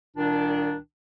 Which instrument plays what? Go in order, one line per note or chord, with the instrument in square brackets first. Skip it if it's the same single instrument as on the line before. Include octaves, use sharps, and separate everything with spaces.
[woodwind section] C2 A#2 D#3 D4